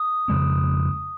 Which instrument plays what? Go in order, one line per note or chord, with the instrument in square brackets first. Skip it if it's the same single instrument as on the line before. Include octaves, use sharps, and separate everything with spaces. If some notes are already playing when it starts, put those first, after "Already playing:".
Already playing: [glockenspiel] D#6
[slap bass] F2 C#3 G#3 C4